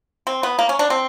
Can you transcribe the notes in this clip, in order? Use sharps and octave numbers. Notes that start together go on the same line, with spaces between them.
C4
B3
A#3
C#4
D4
C4